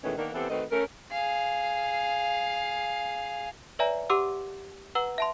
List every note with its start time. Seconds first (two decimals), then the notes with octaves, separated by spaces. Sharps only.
0.04 B2 D#3 E3 G#3 A3 C#4
0.18 D#3 A#3 B3 D4
0.34 E3 B3 C4 G4 A4
0.50 D#3 A3 C4 F#4 B4 D#5
0.71 A3 C#4 A#4
1.11 G#4 F5
3.79 B4 C#5 D5 E5 G#5 A#5
4.10 G4 F#5 C6 D6 E6
4.95 B4 F#5 A#5 E6 G7
5.18 E5 A5 C6